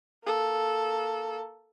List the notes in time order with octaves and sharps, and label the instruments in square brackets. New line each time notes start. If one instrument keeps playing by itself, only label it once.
[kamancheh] A#3 A4